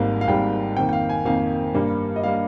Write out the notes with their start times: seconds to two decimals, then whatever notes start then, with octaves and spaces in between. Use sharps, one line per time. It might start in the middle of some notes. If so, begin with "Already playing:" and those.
Already playing: G#1 G#2 G3 A#3 F5
0.21 F5
0.27 G#1 G#2 G3 A#3 G5
0.76 F2 D#3 A#3 G5
0.89 G5
0.93 F5
1.09 G#5
1.25 F2 D#3 A#3 F5
1.74 G2 G3 A#3
2.16 D#5
2.23 G3 A#3 F5